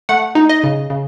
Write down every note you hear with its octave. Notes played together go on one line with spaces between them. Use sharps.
A3 F#5
D#4
D#5
C#3
C#3